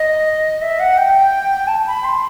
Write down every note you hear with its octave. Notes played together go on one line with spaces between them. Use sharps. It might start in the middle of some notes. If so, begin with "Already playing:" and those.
Already playing: D#5
E5
F#5
G5
A5
B5
C6